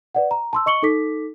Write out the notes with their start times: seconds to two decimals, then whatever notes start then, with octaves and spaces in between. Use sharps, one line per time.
0.15 B4 D5 F#5
0.31 A#5
0.53 A5 C6 E6
0.66 D#5 C#6 C#7 F#7 G7
0.82 D#4 A4 D6 B6